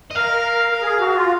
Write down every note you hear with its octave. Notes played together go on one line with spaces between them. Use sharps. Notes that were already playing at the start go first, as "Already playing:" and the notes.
D#5
A#4 F5
A#4
G#4
F#4
F4